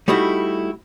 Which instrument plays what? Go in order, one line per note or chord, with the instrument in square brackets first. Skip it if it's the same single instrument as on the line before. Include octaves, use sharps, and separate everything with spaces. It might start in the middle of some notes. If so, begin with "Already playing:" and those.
[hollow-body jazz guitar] G3 A3 D#4 E4 F#4